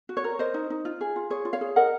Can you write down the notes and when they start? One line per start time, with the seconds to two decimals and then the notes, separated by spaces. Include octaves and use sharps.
0.09 F#4
0.17 C#5
0.24 A#4
0.39 A#4 C5 D#5
0.54 D#4
0.70 D#4
0.85 F4
1.01 G#4
1.16 F4
1.30 G#4 C#5
1.45 F4
1.53 C#5 F5
1.61 G#4
1.76 A#4 D#5 F#5